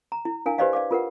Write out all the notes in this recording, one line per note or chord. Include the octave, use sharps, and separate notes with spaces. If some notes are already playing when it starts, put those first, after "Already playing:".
A#5
E4
D4 E4 A#4 F5 G#5
G4 B4 C5 D5 D#5 F5
D5 F5 D6
F4 A#4 B4 F#5